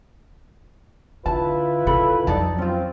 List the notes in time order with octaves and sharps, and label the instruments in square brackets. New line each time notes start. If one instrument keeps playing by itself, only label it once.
[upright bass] D3 [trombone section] E4 F4 B4 [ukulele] A5
[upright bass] C#3 [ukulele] A4 B5
[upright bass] F2 F#3 [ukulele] D#4 D5 A5
[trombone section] C4 [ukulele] C#4 F4